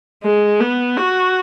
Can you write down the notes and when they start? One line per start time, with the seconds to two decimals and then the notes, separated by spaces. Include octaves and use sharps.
0.24 G#3
0.60 B3
0.97 F#4